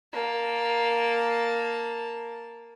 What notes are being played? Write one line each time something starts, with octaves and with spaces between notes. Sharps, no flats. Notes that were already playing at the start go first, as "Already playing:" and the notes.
A#3 A5